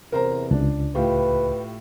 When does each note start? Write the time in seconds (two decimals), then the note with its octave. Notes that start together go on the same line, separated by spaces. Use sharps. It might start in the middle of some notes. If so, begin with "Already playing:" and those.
0.12 E2 C3 A#4 C5 A#5
0.51 C#2 D4
0.95 A2 F4 G4 B4